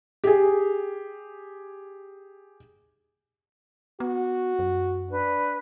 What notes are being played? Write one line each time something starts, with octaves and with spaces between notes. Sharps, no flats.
G4 G#4
B3 F#4
F#2
D4 B4